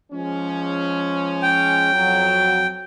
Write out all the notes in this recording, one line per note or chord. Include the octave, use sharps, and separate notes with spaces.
F3 G#3 C#4
G5
F2 F#3